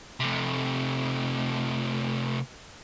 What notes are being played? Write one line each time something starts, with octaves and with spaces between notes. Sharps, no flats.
C3 A3